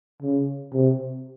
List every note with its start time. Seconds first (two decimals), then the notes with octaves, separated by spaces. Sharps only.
0.22 C#3
0.73 C3